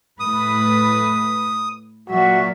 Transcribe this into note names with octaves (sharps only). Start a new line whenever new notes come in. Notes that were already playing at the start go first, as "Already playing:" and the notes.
A2 B4 D#6
A#2 F#3 F#4 E5